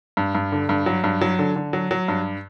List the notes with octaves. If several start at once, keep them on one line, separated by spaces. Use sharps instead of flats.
G2
G2
D3
G2
F#3
G2
F#3
D3
D3
F#3
F#3
G2